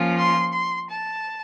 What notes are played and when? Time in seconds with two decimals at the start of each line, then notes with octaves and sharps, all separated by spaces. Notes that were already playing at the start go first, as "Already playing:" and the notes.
Already playing: F3 A#3 C#4 F4
0.17 C6
0.52 C6
0.89 A5